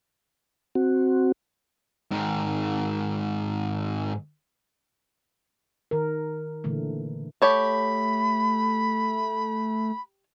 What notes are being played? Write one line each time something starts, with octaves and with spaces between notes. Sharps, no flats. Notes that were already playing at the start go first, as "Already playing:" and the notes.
C4 F#4
G#2 D#3
D#3 A#4
A#2 D3 E3 A3
A3 G4 C#5 A5 B5